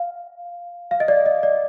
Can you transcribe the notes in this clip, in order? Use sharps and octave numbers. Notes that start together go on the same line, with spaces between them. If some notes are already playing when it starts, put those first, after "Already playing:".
Already playing: F5
F5
D#5
D5
D#5
D5